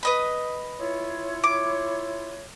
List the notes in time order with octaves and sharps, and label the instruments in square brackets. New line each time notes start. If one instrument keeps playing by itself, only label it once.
[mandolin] B4 D#5 B5
[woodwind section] E4 F4 C#5
[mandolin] D6